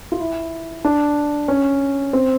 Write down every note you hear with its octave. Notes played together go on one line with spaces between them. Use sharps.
F4
E4
D4
C#4
C4